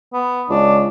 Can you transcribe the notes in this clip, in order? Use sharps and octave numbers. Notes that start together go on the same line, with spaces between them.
B3
C#2 D4